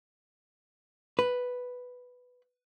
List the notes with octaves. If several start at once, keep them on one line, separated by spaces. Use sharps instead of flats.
B4